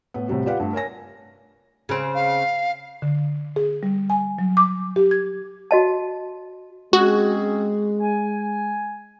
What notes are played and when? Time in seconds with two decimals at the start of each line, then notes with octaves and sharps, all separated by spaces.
0.14 A2 B3
0.28 A2 C3 G3 F#4
0.46 F4 G4 B4 D5 F5 F#5
0.60 G2 A3
0.73 A#4 C#5 G#5 A#6
1.89 C#3 C4
2.15 F5
3.02 D3
3.56 G#4
3.83 G3
4.10 G#5
4.39 F#3
4.57 D6
4.96 G4
5.11 G#6
5.71 F#4 D#5 A5
6.93 G#3 C4 C#4 F#4 G#4
8.01 G#5